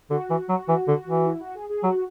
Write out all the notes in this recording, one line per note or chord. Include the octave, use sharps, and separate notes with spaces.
D3 F#4
E3
F#3
E3
D3
E3
E4
F#4
G#4
G#4
F#3 F#4